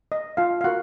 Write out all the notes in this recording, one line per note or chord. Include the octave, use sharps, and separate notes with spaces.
D#5
F4 F5
F5
F4 F#4 A#4 F#5